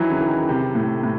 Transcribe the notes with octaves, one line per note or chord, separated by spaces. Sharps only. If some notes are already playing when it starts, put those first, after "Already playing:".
Already playing: D#3 E3 F#3
C#3
D#3
C3
A2
A2